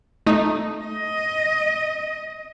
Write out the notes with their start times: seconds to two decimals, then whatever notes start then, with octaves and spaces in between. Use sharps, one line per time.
0.26 A3 D#4
0.84 D#5